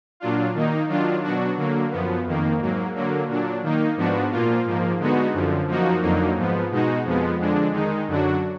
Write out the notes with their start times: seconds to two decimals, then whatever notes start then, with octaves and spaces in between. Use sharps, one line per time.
0.20 A#2 F#3 D4 F4
0.54 D#3 A#3 D#4
0.88 D#3 F#3 D4 F4
1.23 B2 F#3 D4 F#4
1.57 D3 F#3 A#3
1.91 F#2 F3 B3
2.26 F2 D#3 A#3
2.59 G#2 F#3 A#3
2.94 D3 F#3 A#3
3.28 A#2 F#3 D4
3.63 D#3 A#3 D#4
3.97 G#2 F3 B3 D4 F#4
4.31 A#2 F3 A#3 F4
4.65 G#2 F3 A#3
4.99 D3 G#3 B3 D#4 F#4
5.34 F#2 D3 F3
5.68 F#2 F3 A#3 D#4 F#4
6.02 F2 D3 F#3 A#3 D#4
6.36 G#2 F3 B3
6.71 B2 G#3 D#4 F#4
7.05 F2 F3 G#3 B3
7.40 F2 D3 G#3 D4
7.74 D#3 G#3 D#4
8.07 F#2 D3 F#3 D4 F#4